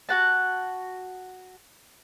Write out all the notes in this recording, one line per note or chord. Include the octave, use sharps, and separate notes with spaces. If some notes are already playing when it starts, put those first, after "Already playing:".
F#4 F#5 A5